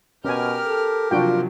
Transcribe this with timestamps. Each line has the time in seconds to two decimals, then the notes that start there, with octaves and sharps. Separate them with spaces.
0.25 B2 C#4 G4 A#4 G5 G#5 F6
0.66 A4
1.11 C3 F3 F#3 D4 F4 F#4 G5